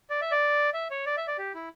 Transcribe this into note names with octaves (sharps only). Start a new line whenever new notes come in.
D5
E5
D5
E5
C#5
D5
E5
D5
G4
E4